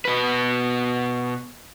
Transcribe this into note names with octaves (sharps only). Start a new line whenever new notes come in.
B2 B4